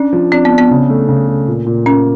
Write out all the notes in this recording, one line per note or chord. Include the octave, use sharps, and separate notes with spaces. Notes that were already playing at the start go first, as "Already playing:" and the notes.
Already playing: C#4 D4
F3
C4 D4
B3
D4
B3
C#3
A3
C#3
A3
A#2
A#2
A#3 C#4